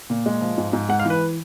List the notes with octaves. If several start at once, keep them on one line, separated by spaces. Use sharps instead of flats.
A#2
G#3
F3
G#2
G#2
G#3 F#5
F5
E3
B4